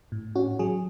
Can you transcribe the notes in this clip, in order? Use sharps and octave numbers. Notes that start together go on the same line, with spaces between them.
A2
C#4 F#4
F#3 G#4